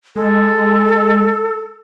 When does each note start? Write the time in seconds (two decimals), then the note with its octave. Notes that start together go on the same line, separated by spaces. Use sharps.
0.16 G#3 A4